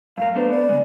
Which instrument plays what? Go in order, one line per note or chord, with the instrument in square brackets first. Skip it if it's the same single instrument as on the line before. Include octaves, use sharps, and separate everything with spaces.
[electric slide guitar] F#2 A2 A#4 [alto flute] F5
[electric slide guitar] A3 D4 C5 [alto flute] B3
[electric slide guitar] B3 [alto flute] D5
[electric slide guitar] C#3 G#3